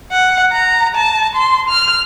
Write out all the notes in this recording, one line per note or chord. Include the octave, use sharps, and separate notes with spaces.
F#5
A#5
A5
C6
F6